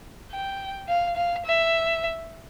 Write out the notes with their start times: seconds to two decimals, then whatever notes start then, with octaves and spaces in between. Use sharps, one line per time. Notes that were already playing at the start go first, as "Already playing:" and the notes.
0.32 G5
0.88 F5
1.16 F5
1.46 E5